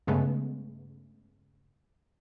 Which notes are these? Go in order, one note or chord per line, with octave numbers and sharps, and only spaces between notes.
G2 C#3 G#3 A3 B3